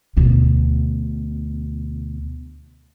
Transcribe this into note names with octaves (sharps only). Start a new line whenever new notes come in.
D2 B2